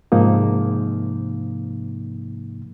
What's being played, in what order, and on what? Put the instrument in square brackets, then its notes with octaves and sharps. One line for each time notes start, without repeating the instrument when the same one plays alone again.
[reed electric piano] G#2 C3 F3 A#3 D#4